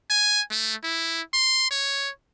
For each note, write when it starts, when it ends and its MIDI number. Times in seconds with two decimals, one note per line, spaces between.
0.10 0.42 80
0.51 0.74 57
0.83 1.22 64
1.34 1.70 84
1.71 2.10 73